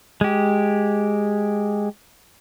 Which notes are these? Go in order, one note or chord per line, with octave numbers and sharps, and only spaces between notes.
G#3 G4